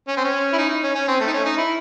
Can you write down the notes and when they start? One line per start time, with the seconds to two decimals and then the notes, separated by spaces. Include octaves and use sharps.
0.08 C#4
0.17 C4
0.24 C#4
0.53 E4
0.58 D#4
0.69 D#4
0.83 C#4
0.95 C#4
1.08 C4
1.20 A3
1.27 D#4
1.33 C#4
1.45 D#4
1.57 E4